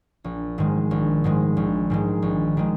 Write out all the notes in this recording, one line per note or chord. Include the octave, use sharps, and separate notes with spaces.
A#1
G#2 D#3 G#3
A#1
G#2 D#3 G#3
A#1
G#2 D#3 G#3
A#1
D#3 G#3